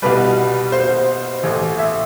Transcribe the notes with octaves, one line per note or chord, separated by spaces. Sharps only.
C2 B2 G3 B4
C5
A1 A2 E3
E5